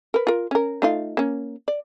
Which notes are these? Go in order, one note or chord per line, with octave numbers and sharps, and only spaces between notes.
A#4 B4
F4 A#4
C#4 A#4
A3 D#4 F4
A#3 C#4
D5